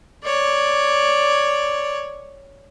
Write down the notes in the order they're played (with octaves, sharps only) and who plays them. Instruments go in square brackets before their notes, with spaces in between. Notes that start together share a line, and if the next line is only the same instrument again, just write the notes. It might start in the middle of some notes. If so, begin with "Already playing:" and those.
[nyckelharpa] C#5 D5